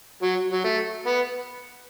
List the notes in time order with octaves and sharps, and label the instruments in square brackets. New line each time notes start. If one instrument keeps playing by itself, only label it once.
[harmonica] F#3
F#3
A3
B3